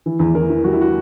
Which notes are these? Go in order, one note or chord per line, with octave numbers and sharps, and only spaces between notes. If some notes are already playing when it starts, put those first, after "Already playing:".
E3
E2
E3 A#4
E3
G3 F#4
E4
F#4